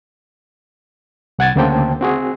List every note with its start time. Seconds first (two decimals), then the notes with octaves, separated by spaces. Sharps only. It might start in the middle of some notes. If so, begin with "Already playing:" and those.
1.39 C2 F#5 G#6 A6
1.56 D2 C#3 A#3 C5 G5 A5
2.01 C4 F#4 G#4